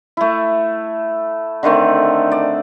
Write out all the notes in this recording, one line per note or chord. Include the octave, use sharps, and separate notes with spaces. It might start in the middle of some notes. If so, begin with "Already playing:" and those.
A3 E4
D3 D#3 A3 C4
D5